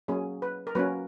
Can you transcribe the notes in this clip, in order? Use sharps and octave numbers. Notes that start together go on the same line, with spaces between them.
F#3 A#3 C#4 G#4
B4
A#4
F#3 A#3 C#4 B4